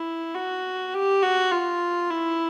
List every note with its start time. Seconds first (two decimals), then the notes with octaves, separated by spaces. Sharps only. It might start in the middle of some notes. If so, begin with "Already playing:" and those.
Already playing: E4
0.35 F#4
0.94 G4
1.22 F#4
1.51 F4
2.10 E4